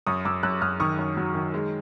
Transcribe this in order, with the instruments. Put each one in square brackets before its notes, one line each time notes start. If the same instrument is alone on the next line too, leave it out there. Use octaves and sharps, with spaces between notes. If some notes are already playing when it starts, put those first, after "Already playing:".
[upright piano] F#2 C#6 D#6
F#2 D6 E6
F#2 E6 F#6
F#2 D#6 F6
D#3 C#6 D#6
F#2
F#3
D#3
G#3